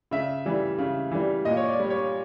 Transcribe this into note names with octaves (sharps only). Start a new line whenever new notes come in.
C#3 E5
E3 G3
C#3
E3 G3
A#2 D#5
C#5
D5
G3
C#5